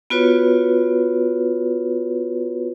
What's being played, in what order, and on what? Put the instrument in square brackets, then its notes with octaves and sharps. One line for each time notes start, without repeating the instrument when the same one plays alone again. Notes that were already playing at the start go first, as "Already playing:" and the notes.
[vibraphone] B3 F4 F#4 B4 C#5